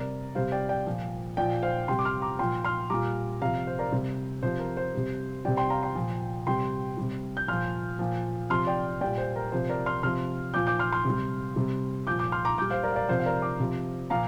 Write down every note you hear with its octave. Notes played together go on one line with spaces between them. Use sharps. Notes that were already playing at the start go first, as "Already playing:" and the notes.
Already playing: C3 G3 A#4 D5
C3 G3 C5 F5
D5 G5
D5 G5
A#2 F3
A#2 F3 D5 G5
C5 F5
C3 G3 G5 C6
D6
C6 F6
A#5 D6
A#2 F3 G5 C6
C6 F6
A#2 G3 A#5 D6
C3 F3 F5 A#5
C5
A#4 D5
C3 G3 C5
C3 F3 C5
A#4
C5
C3 G3
C3 G3 D5 G5
G5 C6
F5 A#5
G5 C6
A#2 F3
C3 G3 G5 C6
C3 G3
G6
A#2 F3 C6 F6
A#2 F3
C3 F3 C6 F6
D5 G5
A#2 G3 D5 G5
C5
A#4
C3 F3 C5
A#4 D5
C6 F6
C3 F3 C6 F6
A#2 F3 D6 G6
D6 G6
C6 F6
C6 F6
C3
G3
C3 G3
A#2 F3 D6 G6
D6 G6
C6 F6
A#5 D6
A#2 G3 D6 G6
C5 F5
A#4 D5
F5
A#4 D5
C3 F3 C5 F5
F5
A#4 D5
A#5 D6
C3 F3
A#2 F3 F5 A#5